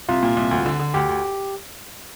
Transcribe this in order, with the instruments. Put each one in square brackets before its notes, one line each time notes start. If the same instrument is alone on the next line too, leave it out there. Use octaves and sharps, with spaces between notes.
[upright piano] C2 [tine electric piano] F4
[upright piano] A#2
C2
D2
D3
D3
[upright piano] D2 [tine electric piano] G4
[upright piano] D2